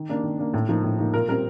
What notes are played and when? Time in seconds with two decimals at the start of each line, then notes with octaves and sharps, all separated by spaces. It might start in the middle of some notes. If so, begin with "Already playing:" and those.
Already playing: D#3
0.09 A#3 D4
0.23 D#3
0.38 A#3 D4
0.54 A2
0.68 F3 A#3 D#4
0.84 A2
0.98 F3 A#3 D#4
1.13 A#2 A#4
1.28 G3 C4 A#4